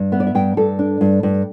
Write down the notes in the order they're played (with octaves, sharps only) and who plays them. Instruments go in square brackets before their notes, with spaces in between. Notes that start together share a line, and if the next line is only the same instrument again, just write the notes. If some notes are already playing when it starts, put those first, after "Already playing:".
Already playing: [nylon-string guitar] G2
B3 E5
D5
E5
G2 G5
G2 A4
D4
G2
G2